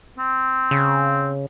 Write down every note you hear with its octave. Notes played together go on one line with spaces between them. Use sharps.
C4
C#3